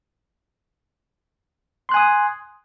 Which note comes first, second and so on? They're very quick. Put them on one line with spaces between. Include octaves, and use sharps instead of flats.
C6 F#6 G#5 D#6